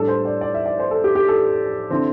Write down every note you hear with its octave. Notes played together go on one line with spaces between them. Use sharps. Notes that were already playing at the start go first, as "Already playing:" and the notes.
Already playing: A2 G3 D4 A4
C5
D5
D5
E5
D5
C5
A4
G4
G4
A4
D3 C4 E4